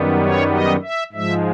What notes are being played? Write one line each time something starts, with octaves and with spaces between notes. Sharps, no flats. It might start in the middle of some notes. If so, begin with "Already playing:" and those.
Already playing: F#2 D#3 G3 B3
C#5
D#5
E5
G#2 F3 G#3 E5